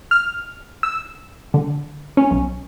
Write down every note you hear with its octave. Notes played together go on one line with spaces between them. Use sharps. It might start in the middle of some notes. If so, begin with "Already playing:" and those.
F6
E6
D3
C#4
B1